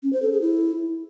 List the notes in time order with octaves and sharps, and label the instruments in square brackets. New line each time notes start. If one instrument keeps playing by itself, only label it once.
[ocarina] C#4
C5
A4
G#4
E4